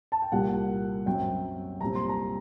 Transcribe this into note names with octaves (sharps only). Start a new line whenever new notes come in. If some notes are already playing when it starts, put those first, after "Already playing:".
A5
G5
C2 A#2 G3 A#3 F#5
F#2 F#3 C4 G5
C2 A#2 G3 C4 A#5
C6
A#5